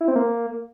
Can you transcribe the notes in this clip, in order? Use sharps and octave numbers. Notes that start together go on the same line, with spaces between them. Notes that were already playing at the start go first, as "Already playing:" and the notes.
E4
C4
A#3